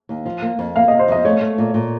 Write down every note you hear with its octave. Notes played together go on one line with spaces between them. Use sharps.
D#2
F3
A#3
F2
A#3 F5
D#5
C3
C5
F2 D#5
A3 C#5
A3
A#2
A#2